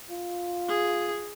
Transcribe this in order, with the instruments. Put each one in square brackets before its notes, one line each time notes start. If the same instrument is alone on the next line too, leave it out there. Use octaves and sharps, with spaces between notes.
[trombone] F4
[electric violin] G#4